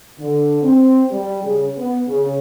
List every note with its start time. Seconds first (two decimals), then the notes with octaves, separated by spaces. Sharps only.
0.19 D3
0.63 C4
1.11 G3
1.43 C#3
1.77 B3
2.08 C#3